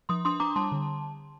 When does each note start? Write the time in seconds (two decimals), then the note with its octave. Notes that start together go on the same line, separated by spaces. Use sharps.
0.09 F3 C6 D#6
0.25 D4 C6 D#6
0.40 D4 A#5 D6
0.56 G3 A5 C6
0.72 D3